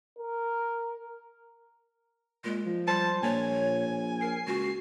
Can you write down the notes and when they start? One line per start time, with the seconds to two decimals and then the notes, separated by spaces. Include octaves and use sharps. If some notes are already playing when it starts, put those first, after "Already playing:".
0.19 A#4
2.44 A#2 G#3
2.65 F3
2.87 G3 C5 A5
3.23 A#1 A#2 C#5 G#5
4.21 A#4 C7
4.46 C#2 F#4